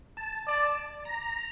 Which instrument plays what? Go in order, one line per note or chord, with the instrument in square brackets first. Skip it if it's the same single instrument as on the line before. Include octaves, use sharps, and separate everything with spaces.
[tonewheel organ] A5
[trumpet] D5
[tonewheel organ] A#5